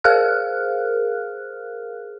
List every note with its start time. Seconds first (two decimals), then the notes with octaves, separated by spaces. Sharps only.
0.04 G#4 A#4 C5 F5 F6 F#6